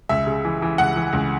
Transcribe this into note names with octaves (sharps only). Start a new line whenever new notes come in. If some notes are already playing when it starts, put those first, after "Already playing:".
C#2 E5
C#3
E3
E3
C#2 F#5
E3
C#2